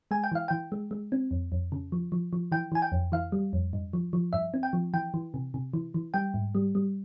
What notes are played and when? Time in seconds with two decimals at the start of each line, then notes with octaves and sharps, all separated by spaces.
0.11 G#3 G#5
0.24 G5
0.32 E3 F5
0.48 E3 G5
0.72 G#3
0.91 G#3
1.12 C4
1.31 F2
1.52 F2
1.72 C#3
1.92 F3
2.12 F3
2.33 F3
2.52 E3 G5
2.72 E3 G#5
2.82 G5
2.92 F2
3.12 E3 F5
3.32 G3
3.53 F2
3.73 G2
3.93 F3
4.13 F3
4.33 G2 E5
4.54 C4
4.63 G5
4.73 F3
4.94 E3 G5
5.14 E3
5.34 C3
5.54 C3
5.73 E3
5.94 E3
6.14 G3 G5
6.34 G#2
6.55 G3
6.75 G3